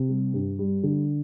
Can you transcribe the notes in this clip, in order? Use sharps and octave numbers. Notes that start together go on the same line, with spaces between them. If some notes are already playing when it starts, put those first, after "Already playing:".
Already playing: C3
G3
G2
G3
D3